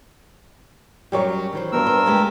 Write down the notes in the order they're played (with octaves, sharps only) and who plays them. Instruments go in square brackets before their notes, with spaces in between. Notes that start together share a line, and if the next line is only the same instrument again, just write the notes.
[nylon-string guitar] F#2 F#3 G3 [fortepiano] G4 A#4 C#5
[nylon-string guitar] D#3 E3 C5
[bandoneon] G2 A#4 E6 [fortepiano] B2 B3
[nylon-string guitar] C5
D2 G#3 G4